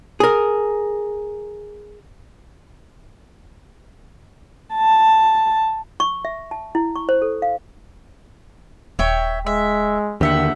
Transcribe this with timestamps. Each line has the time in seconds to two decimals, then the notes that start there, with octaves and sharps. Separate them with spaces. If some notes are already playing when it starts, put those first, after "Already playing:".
0.20 G#4 A#4
4.75 A5
6.00 C#6
6.25 E5
6.51 A5
6.75 E4
6.96 C#6
7.09 C5
7.22 A4
7.42 F5
8.99 D#1 C#5 E5 G5
9.47 G#3 E5
10.21 D#2 D3 G4 E5 F#5